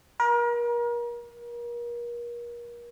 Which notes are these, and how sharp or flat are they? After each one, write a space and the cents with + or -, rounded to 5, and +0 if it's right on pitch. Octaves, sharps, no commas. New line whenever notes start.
A#4 +35